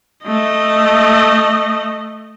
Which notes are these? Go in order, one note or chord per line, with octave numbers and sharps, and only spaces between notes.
A3 D#5